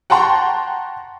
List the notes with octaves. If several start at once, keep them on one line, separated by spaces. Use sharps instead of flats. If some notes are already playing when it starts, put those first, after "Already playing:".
F#5 G5 A5 A#5 C6 C#6